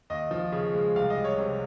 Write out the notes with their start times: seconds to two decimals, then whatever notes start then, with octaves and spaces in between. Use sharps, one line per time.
0.10 D#2 D#5
0.31 F3
0.52 C#3
0.74 G#3
0.96 C2 F5
1.10 D#5
1.17 G3
1.24 C#5
1.39 C3